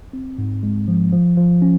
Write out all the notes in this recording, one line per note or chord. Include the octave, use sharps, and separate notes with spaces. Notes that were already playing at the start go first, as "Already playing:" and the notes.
C4
G#2
G#3
F3
F3
F3
C#4